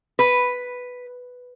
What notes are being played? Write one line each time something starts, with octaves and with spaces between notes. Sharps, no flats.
B4